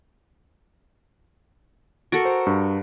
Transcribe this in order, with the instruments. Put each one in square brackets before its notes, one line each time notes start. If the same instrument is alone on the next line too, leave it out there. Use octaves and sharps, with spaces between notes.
[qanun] F#4 A4 A#4 [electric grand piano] D7
[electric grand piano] C5
G2